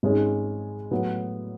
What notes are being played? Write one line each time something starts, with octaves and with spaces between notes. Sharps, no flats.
G#1 G#2 G#3 C#4 G#4
A2 F#3 B3 F#4